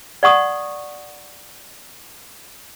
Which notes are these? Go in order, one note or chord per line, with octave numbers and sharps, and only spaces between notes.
D5 F#5 C#6 D#6